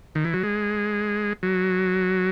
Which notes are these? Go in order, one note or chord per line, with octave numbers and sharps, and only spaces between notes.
D#3
E3
F#3
G#3
F#3